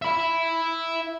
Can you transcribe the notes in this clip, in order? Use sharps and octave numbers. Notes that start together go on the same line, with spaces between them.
E5 B5